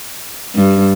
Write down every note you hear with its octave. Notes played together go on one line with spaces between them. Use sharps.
G2